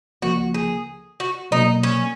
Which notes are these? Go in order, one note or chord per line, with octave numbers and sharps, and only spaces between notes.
C#2 C#3 F3 A#3 F#4
G#4
F#4
B2 F#3 A#3 D#4
C#4